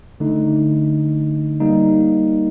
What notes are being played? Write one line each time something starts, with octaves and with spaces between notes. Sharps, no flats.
D3 A3 D#4
G3 A#3 D#4